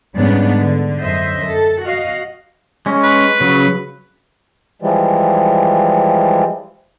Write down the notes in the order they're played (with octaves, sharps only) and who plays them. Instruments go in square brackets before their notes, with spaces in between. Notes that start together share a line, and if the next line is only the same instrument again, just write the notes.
[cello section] G#2 C#3 G3 B3 D4
D3
F#2 C5 D#5 E5
A4
F#4 D#5 F5
[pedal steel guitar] G#3 C#4
[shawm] B4
[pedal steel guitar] C#3 F#3
[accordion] E3 F3 G3 G#3